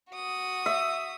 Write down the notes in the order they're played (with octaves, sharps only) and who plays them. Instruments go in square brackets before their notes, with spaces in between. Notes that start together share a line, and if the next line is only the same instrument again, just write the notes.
[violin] F#4 D#6
[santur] E5